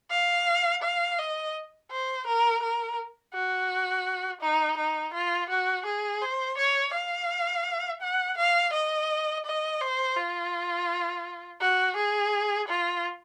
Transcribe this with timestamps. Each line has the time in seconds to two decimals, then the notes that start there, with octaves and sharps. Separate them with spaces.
0.10 F5
0.83 F5
1.18 D#5
1.91 C5
2.27 A#4
2.63 A#4
3.33 F#4
4.41 D#4
4.78 D#4
5.14 F4
5.49 F#4
5.86 G#4
6.21 C5
6.58 C#5
6.93 F5
8.01 F#5
8.38 F5
8.73 D#5
9.46 D#5
9.81 C5
10.16 F4
11.61 F#4
11.97 G#4
12.68 F4